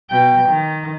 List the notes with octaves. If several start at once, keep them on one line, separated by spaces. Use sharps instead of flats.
B2 G5
D#3